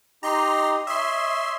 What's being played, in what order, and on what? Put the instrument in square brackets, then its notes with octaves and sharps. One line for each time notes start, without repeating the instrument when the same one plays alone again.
[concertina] D#4 G4 [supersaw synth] A#5 C6
[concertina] C#5 D#5 [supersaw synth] E5 C6